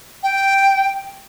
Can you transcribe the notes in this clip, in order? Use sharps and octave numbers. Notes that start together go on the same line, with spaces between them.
G5